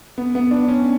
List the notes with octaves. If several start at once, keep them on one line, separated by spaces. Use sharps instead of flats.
B3
B3
D4
C#4